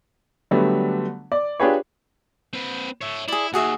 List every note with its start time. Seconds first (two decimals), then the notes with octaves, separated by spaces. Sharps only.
0.51 D3 F#3 G3 A3 B3
1.32 D5
1.60 D4 F4 G4 G#4 B4 C#5
2.53 C4 B4
3.01 C#5 E5
3.28 E4 G#4 D5
3.54 D#2 F#4 G#4 E5